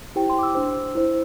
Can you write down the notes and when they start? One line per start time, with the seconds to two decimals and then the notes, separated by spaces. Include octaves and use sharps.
0.16 E4 G4 C5 G5
0.30 C6
0.39 D6
0.43 E6
0.55 D4 C5
0.95 E4 C5